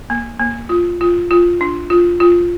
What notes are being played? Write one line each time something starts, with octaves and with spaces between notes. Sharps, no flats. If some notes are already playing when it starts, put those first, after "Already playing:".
A#3
A#3
F4
F4
F4
D4
F4
F4